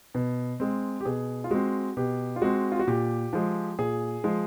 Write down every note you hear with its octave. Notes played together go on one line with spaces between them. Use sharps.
B2
G#3 C4
G4
B2 G#4
F4
G#3 C4 F#4
B2 G4
F4
G#3 C4 F#4
F4
F#4
A#2 G4
F3 G#3
A#2 G#4
F3 G#3